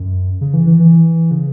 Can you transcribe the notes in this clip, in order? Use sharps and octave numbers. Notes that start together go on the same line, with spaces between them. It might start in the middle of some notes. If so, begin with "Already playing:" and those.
Already playing: F#2
C#3
E3
E3
E3
C#3